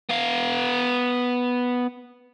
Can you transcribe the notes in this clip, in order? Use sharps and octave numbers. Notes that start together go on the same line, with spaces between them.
B3 F5